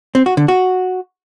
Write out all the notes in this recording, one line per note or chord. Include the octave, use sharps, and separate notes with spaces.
C4
F#4
D3
F#4